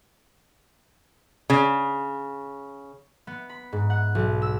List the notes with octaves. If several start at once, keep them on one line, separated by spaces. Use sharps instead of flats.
C#3
B3
B5
G#2
F#5
B1
E6